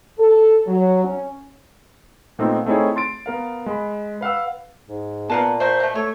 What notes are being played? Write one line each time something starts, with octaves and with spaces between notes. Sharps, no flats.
A4
F#3
C#4
A#2 A3 B3 C4 D#4
A3 C4 D#4 E4 G#4 C#5
C6 A6 D7
B3 A#4 F5
G#3 B5
B4 F5 F#5 E6
G#2
A#2 B3 A#4 F5 A5
A3 A#3 C5
B2 A3
A3 C#5